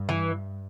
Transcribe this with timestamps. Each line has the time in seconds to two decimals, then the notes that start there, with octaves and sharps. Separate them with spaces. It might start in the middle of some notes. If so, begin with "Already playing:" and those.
Already playing: G2
0.09 E3